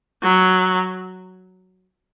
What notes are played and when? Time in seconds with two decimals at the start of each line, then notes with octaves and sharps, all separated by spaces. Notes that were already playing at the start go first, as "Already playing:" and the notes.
0.22 F#3